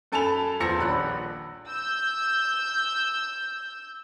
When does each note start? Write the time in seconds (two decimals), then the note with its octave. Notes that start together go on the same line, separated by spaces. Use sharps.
0.12 F#2 A4 G#5 A5 B5 F7
0.60 E2 F3 C6 E6 A#6 C#7
0.78 D#1 A#1 B5 F#6
1.69 E6 G6